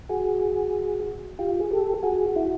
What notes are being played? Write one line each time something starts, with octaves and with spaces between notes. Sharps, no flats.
F#4 G#4
F4 G4
G#4
G4 A4
F#4 G#4
E4 F#4